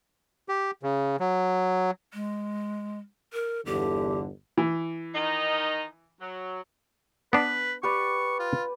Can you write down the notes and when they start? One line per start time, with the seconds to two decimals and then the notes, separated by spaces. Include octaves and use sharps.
0.49 G4
0.83 C#3
1.20 F#3
2.14 G#3
3.33 A#4
3.66 G1 E2 D3 G4
4.57 E3
5.15 D#3 D#4
6.21 F#3
7.33 B3 D4 B4
7.83 G4 B4 D5 C#6
8.39 F4